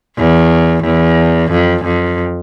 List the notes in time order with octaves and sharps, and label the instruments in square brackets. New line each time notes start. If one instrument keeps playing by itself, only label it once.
[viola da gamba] E2
E2
F2
F2